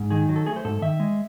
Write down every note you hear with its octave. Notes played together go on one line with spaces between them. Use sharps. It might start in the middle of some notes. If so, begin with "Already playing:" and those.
Already playing: G#2
D#3 G#4
F#3
A4
A3 G#4
C5
G#2 A4
D#3 E5
G#3